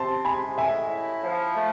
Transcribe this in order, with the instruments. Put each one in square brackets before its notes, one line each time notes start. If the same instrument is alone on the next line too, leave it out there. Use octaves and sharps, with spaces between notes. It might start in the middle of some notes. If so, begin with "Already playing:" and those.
Already playing: [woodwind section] C3 C4 [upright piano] A5 C6
[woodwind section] G#3 [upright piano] G#5 B5
[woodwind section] A2 [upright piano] E5 G#5
[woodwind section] E4
F3
A3